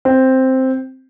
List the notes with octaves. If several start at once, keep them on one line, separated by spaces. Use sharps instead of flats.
C4